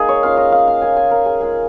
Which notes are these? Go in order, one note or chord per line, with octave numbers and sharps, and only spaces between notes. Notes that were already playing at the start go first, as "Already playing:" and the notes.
Already playing: A#3 D#4 G#4
C#5
G#3 C#4 F4 F5
D#5
F5
F5
A#3 F4 G#5
G#5
A#4
G#4
G#3 F4 G#4